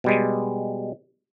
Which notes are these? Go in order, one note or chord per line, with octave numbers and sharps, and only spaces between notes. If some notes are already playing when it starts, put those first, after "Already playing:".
B2 G3 G#3